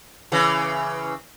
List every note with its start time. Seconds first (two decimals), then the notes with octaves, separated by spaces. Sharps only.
0.32 C#3 E3